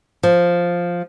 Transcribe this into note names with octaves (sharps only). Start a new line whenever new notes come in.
F3